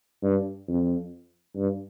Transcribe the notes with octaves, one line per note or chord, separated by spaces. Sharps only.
G2
F2
G2